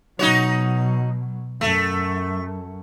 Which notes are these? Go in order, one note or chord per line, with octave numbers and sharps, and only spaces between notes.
B2 F#3 D#4 F#4 C#5
F#2 A3